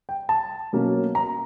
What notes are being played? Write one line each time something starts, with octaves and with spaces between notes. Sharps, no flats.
G5
A5
B2 F#3 A#3 C#4
A#5